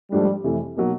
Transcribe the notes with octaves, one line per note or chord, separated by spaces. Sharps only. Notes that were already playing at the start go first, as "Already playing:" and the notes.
G#2 F3 G3 A3 D4
F2 C3 E3 A3
B2 F#3 A#3 D#4